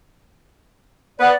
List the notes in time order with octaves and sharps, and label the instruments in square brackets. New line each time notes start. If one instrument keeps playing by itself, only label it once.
[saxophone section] B3 [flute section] D5 F#5